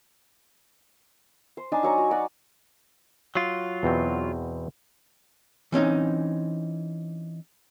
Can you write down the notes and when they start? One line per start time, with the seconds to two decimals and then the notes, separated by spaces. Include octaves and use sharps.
1.57 C5
1.72 D4 D#4 G#5 A5
1.83 F#3 C#5 A#5
1.98 F#4
2.11 F#4 D5
3.35 F#3 F4
3.83 E2 B2 C4
5.72 E3 C4 C#4 D#4